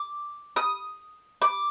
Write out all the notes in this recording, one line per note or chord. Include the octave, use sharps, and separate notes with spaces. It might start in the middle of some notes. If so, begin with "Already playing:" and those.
Already playing: D6
D#6
D6